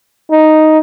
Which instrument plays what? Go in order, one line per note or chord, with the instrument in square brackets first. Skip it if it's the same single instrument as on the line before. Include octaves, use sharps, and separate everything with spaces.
[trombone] D#4